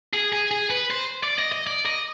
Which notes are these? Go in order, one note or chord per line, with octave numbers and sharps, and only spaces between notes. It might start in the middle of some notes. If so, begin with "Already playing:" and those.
G#4
G#4
G#4
B4
C5
D5
D#5
D#5
D5
D#5